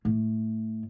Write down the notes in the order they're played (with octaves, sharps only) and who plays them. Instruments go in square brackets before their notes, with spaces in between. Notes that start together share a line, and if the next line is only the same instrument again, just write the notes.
[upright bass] A2